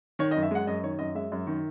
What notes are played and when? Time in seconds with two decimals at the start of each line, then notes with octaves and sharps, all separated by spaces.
0.19 D#3 C#5
0.31 D#5
0.36 F#2
0.43 E5
0.51 G#3 F#5
0.67 F#2 D#5
0.83 D#3 C#5
0.99 F#2 D#5
1.15 G#3 E5
1.32 F#2
1.47 D#3